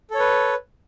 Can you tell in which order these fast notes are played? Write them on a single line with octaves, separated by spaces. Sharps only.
A4 C#5 B4